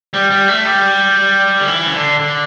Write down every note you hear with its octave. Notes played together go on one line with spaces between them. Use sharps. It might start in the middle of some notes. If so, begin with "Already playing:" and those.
G3
G3
A3
G3
D3
E3
C#3
D3
D3